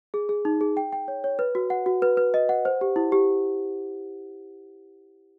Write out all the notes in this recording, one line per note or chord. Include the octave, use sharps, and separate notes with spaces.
G#4
G#4
D#4
G#4
G5
G5
C#5
C#5
B4
F#4
F#5
F#4
B4
B4
D#5
F#5
C5
G4
E4
G4